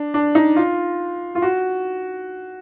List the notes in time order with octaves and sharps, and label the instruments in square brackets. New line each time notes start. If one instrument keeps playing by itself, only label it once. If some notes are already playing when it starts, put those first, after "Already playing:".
Already playing: [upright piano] D4
D4
D#4
F4
F4
F#4